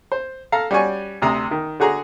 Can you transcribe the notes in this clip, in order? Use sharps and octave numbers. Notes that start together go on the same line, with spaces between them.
C5
A4 F5 A#5
G3 C#4 F#4 D5 G#5 C#6
D2 C3 A#5 C6 D#6
D#3
D3 F#4 G#4 A#5